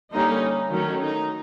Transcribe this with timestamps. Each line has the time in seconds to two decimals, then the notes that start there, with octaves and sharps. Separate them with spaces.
0.12 D3 G3 A#3 C#4 D#4
0.71 D#3 F#3 A3 C#4
1.01 D#4